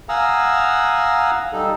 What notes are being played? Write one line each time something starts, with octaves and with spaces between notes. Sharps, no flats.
F5 F#5 G#5 A#5 D#6 E6
G3 D#4 A4